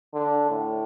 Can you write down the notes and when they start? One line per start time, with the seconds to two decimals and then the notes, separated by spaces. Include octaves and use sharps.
0.13 D3
0.49 A2